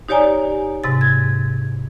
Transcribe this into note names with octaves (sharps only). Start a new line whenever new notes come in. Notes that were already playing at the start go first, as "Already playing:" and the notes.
D#4 G4 C#5 D5 G#5 A#5
G#2 C3 A6
G#6